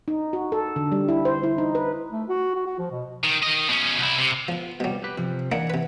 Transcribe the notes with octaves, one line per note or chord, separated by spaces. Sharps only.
D#4
F#4
A4
D3
G3
E4
C5
E4
D#4
B4
A3
F#4
F#4
F#4
F3
B2
D#3
D#3 D#5
B2 C#4
C2 E4
C3
F3 B3 F4
C2 B2 F#3 G3
G4 B4
C3 F3
E3 A#3 D4 D#4 F#5
C3 B4